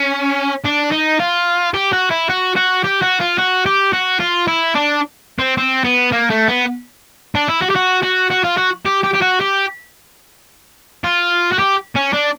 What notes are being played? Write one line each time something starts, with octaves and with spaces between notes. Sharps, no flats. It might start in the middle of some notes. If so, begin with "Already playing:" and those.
Already playing: C#4
D4
D#4
F4
G4
F#4
E4
F#4
F#4
G4
F#4
F4
F#4
G4
F#4
F4
E4
D4
C4
C4
B3
A#3
A3
B3
D4
E4
F#4
G4
F#4
F#4
F#4
F4
F#4
G4
G4
G4
F#4
G4
F4
F#4
G4
C#4
D4